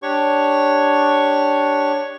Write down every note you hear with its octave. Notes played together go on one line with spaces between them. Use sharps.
D4 G4 C#5 C#6